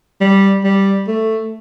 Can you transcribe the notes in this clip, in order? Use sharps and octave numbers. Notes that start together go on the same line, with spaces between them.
G3
G3
A3